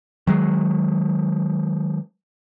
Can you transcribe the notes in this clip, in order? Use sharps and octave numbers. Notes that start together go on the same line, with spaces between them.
D#3 F#3 G#3